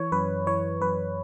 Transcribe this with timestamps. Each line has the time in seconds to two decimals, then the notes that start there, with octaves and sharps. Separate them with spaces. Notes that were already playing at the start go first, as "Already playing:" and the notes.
Already playing: E3 C#5
0.12 F#2 B4
0.47 E3 C#5
0.81 F#2 B4